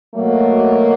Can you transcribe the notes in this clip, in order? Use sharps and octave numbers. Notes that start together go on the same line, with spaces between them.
B2 F#3 A3 A#3